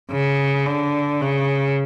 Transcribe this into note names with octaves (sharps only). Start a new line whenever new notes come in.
C#3
D3
C#3